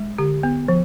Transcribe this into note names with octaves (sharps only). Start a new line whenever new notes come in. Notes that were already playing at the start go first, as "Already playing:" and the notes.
Already playing: G#3
D3 G4
B3
F3